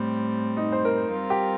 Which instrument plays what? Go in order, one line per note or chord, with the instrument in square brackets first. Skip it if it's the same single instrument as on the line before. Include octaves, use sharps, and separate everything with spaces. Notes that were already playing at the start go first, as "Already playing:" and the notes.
Already playing: [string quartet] A2 G3 C4
[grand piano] D#4
C5
A#4
[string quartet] G3 C4 F4 A#4
[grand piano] G4